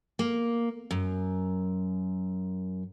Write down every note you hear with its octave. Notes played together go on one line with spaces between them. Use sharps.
A#3
F#2